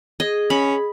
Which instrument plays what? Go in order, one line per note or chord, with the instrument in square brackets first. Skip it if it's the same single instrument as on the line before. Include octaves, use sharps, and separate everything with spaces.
[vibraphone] G#4 [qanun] D#5
[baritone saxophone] C#4 [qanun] B5